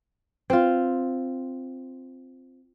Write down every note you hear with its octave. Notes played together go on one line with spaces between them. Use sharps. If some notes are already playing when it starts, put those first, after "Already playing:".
C4 F4